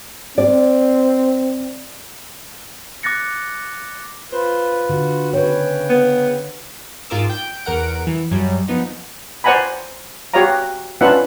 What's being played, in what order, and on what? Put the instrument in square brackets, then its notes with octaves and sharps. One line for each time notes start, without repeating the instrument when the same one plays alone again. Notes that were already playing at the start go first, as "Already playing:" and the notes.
[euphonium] C4 [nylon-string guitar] D5
[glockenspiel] D6 F#6 A6 A#6 C#7
[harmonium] F4 B4 [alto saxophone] C5
[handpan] D3 [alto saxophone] F#4
[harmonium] C#3 G5 [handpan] B4 C#5
[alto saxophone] B3
[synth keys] G#2 F4 G#4 A#4 D6 E6
G5 G6
E2 A#4 F#5 D7
E3
F#2 F#3 G3
F3 B3 D#4
[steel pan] C5 D5 F#5 G#5 A#5 B5
F#4 G4 C#5 D5 F5 A#5
C#4 D4 F4 B4 E5 F#5